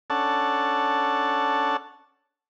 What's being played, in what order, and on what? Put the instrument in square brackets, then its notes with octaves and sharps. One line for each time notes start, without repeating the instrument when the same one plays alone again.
[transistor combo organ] C#4 D4 A4 F#5 A5